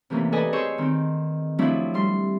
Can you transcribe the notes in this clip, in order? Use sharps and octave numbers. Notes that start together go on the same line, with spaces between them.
C3 E3 A3 A#3 C#4
A4 B4 D5 D#5 G#5
G#4 C5 C#5 C#6 E6
D#3 C4
F3 F#3 A3 C4 D4 E4
G3 C6